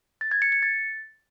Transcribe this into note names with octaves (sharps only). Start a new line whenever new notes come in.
A6
G#6
C#7
C#7
A6